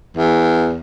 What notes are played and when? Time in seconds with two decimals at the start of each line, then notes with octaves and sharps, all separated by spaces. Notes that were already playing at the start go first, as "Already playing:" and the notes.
0.17 E2